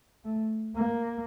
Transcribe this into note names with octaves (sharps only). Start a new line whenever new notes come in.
A3
A#3